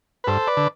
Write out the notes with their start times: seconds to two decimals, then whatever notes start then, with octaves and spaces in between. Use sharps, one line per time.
0.24 B4
0.27 G2 A4 C5
0.47 B4 D5
0.57 D3